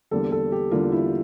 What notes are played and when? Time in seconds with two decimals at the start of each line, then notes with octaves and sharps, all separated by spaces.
0.11 E2 D3 G3 A#3 A4
0.32 A4
0.52 G4
0.71 E2 D3 G3 A#3 F4
0.92 E4